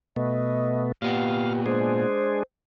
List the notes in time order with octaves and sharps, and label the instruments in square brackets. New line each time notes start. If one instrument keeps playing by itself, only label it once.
[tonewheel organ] B2 A3 B3 [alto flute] D#5
[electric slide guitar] A#2 B3 [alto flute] G4 [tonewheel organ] F5
[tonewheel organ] G#3 D4 G#4 [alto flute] C5